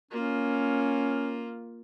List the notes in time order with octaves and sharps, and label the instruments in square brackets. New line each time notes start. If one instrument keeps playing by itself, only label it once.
[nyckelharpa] A#3 F4 [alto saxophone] C#4